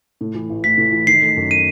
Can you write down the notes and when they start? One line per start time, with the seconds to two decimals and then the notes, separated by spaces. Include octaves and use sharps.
0.21 A2
0.35 E3
0.49 A1
0.64 A1 B6
0.78 A2
0.92 E3
1.07 D#3 C7
1.22 A3
1.37 F#2
1.51 D#7